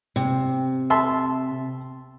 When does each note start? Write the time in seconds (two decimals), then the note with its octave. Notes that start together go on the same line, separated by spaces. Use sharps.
0.16 C3
0.90 E5 A5 C6